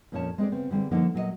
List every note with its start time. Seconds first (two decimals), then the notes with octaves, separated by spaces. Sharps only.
0.12 F2 A#2 F3 C#4 C#5 A5
0.38 G#3 C4 G#4 D5
0.52 C#3 B3 C4
0.71 D3 G3 C4 G#4
0.91 D3 F3 A#3 D#4 A4 F#5
1.14 A#2 F#3 A#4 D#5